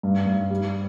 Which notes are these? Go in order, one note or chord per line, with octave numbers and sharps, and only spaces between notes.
G2
G2
G3